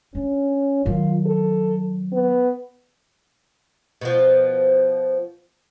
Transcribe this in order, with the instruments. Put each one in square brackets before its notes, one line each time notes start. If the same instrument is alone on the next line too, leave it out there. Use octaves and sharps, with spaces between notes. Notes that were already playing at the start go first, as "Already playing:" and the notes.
[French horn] C#4 [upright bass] D4
[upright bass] D#3 F#3 [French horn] F4
[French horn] A4
B3
[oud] B2 F3